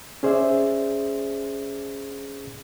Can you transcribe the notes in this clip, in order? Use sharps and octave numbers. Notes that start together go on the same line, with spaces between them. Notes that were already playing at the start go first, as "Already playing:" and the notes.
C#4 G#4 C5 D5 E5